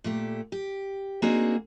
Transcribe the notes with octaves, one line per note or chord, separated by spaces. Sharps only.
A#2 A3 G4
G4
A#3 C4 D4 D#4 F#4 G#4